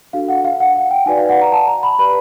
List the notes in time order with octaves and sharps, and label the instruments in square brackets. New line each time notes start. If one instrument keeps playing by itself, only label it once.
[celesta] D4 F#4 A4 F5
F#5
F5
F#5
F#5
G5
D#4 F#4 B4 D5 G#5
F5
F#5
A#5
A5
A#5
B5
G4 B4 D5 B5